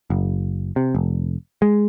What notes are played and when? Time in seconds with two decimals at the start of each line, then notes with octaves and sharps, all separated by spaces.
0.10 F#1
0.76 C3
0.95 F1
1.62 G#3